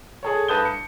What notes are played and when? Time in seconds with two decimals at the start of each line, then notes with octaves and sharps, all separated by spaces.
0.23 G#4 A4 C#5
0.48 G2 B4 A5 D#6 G6 G7
0.65 C#7